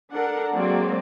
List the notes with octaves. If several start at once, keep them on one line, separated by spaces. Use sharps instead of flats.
D4 A4 A#4 F#5
F#3 G#3 A#3 C4 D5